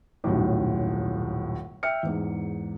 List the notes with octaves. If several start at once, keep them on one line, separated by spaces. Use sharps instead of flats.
D#1 B1 F#2 A2
E5 G5 F6 C#7
E2 G#2